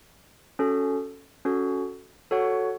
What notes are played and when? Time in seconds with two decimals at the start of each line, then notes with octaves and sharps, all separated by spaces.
0.59 C#4 F#4 A4
1.45 C#4 F#4 A4
2.31 F#4 A4 C#5 F#5